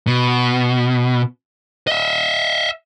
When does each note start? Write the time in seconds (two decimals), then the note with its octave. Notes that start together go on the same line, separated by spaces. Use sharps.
0.07 B2
1.87 D#5 E5